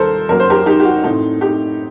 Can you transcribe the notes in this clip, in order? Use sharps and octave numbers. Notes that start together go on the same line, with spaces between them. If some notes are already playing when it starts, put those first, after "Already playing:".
Already playing: D#2 D#3 G3 A#3 A4 A#4 C5
F#2 F#3 A#3 A#4
C5
G4 A#4
D#4 G4
G4
F#4
A2 A3 C4 D#4
D#4 G4